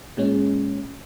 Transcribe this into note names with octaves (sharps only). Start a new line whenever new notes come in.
A#2 G#3 C#4